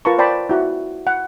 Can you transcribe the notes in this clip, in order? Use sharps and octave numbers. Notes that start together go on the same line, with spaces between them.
F4 A#4 B4 A5 A#5 C#6
C5 D5 G5 A5 B5
E4 F#4 F#5
F#5